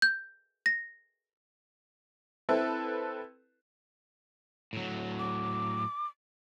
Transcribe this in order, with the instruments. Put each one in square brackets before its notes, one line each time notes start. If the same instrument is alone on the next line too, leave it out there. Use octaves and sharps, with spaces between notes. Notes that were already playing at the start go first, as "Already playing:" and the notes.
[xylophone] G6
A#6
[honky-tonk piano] C4 E4 A4 B4
[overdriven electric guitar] A2 F#3
[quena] D6